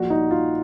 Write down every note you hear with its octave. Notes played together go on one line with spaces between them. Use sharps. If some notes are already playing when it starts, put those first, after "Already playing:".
Already playing: A#1 A#2 F3 F#4
D#4
F4